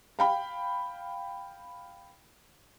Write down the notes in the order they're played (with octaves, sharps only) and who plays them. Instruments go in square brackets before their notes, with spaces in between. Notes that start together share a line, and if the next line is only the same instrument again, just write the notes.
[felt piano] F5 G5 B5